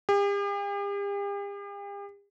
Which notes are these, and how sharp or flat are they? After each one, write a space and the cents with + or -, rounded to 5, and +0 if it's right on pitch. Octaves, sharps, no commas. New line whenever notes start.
G4 +45